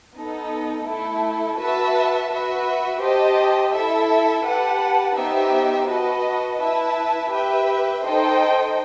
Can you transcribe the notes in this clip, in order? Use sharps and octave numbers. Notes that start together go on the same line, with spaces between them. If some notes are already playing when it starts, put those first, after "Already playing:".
B3 D#4 A4
A3 E4 A4
F#4 B4 E5 A5
F#4 B4 E5
G4 C5 D#5 A5
E4 A4 E5
G4 B4 F#5 A5
B3 D#4 G4 C5 E5
F#4 B4 D#5 A5
E4 B4 E5 A5
G4 B4 E5 G5
D#4 A4 C5 D#5 G5